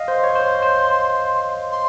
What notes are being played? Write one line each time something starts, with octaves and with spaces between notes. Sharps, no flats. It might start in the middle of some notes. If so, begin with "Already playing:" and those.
Already playing: D#5 F5
C5 C6
C#5
C5
C5
C6